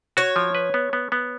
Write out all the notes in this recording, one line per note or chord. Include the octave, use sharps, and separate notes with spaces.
F#4 C#5
F3
B4
B3
B3
B3